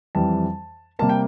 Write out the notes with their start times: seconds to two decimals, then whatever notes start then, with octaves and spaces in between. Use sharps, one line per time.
0.15 F2 E3 G3 A5
0.99 C3 G3 A#3 A5
1.09 G5